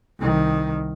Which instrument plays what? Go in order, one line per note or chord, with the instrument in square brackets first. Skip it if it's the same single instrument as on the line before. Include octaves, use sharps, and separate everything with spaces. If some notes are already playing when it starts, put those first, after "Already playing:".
[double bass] C2 D#3